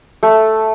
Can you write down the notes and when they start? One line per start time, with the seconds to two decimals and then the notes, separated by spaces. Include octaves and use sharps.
0.23 A3